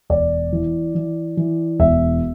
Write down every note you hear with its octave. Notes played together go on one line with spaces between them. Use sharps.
E1 D5
E3
E3
E3
E1 E5